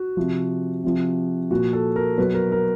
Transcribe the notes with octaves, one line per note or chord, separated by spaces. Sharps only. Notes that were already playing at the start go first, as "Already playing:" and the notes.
Already playing: F#4
C3 F3
C3 F3
A#2 F3 F#4
A4
A#4
B2 F#3 B4
A#4
A#4